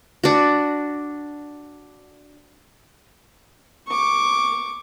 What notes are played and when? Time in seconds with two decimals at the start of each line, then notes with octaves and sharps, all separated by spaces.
0.24 D4 F#4
3.88 C#6 D6